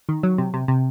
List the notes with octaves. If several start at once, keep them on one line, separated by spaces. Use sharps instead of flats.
D#3
F#3
C3
C3
C3